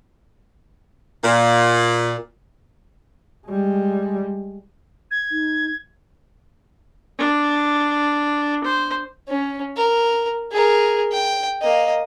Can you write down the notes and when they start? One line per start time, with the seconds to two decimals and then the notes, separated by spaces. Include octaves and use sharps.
1.24 A#2
3.47 G3 G#3
5.11 G#6
5.32 D#4
7.18 D4
8.64 C5
9.28 C#4
9.76 A#4
10.52 G#4 A#4
11.12 G5
11.62 A#3 D#5